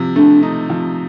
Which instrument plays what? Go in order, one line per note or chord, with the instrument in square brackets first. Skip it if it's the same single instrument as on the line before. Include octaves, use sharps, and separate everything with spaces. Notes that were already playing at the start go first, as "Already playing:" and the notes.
Already playing: [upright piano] C3 F3
[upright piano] A3 [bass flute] D4
[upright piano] D#4
F3